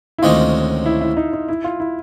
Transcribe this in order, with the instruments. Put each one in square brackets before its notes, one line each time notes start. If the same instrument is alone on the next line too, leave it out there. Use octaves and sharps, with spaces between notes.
[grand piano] E4
[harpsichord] D2 C3 D#3 G#3 C#4 [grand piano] F4
[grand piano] E4
E4
D#4
D#4
E4
F4
E4